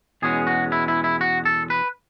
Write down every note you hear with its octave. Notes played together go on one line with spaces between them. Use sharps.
E2 B2 G#3 C#4 G#4
F#4
E4
E4
E4
F#4
A4
B4